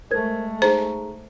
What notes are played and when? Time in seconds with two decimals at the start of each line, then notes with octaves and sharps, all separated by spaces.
0.11 G#3 A3 A#4 C5 G#6
0.62 D#4 G#4 C5 A#5